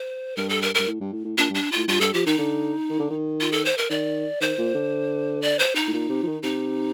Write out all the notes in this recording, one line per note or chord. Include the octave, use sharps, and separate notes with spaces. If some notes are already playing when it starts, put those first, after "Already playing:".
Already playing: C5
G2 A#4
A4
A#4
G2 A#4
A2
G2
A2
A2
A#2 D4
G2
D4
A2 F4
G2 F4
G2 A4
F3 G4
D#3 D#4
D3
D#3
D3
D#3
F4
A4
C5
A#4
D#3 D5
D#3 C5
A#2
D3
D5
C5
D#4
A2
A#2
C3
F3
D#3
C3 D#4